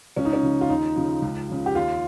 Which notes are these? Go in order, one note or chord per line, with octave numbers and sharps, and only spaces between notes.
C#2 C#4
D#4
C#4
C#3 F3
F4
D#2 D#4
C#3 F3
C#2
C#3 F3
G4
D#2 F4